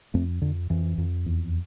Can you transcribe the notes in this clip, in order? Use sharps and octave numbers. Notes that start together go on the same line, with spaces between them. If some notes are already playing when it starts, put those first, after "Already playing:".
F2 A3 C4
F2 D3
F2 E3
F2
E2